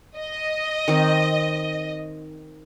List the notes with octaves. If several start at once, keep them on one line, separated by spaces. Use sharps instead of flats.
D#5
D#3 C4 D#4